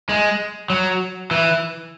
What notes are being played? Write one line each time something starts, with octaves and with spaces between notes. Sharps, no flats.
G#3
F#3
E3